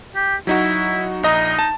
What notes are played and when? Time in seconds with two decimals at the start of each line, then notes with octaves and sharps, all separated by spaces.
0.16 G4
0.47 F#3 D#4 E4 F#4
1.23 A#1 D#4 D#5 A#5
1.59 A5